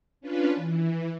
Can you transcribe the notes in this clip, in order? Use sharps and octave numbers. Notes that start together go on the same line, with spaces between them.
C#4 D4 F4 B4
E3